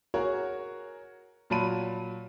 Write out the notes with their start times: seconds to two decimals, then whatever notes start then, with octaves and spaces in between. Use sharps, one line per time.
0.14 F#4 G#4 A#4 C#5
1.50 A#2 F#3 A5 B5 D#7